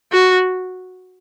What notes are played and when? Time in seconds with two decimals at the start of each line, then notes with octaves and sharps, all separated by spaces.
0.12 F#4